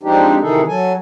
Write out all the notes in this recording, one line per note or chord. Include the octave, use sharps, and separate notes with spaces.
F3 G#3 C4 D4 D#4 G4
C3 D#3 E3 D#4 G#4 A4
F#3 A4 G#5